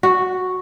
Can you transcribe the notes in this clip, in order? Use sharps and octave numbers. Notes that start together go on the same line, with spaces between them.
F#4